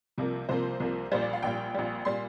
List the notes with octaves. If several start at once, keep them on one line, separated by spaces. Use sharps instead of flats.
C2 C3 F3 A#3
C2 C3 F3 A#3 C5
C2 C3 F3 A#3
A#1 A#2 G3 C5
D5
F5
A#1 A#2 G3 G5
A#1 A#2 G3
A#2 G3 C6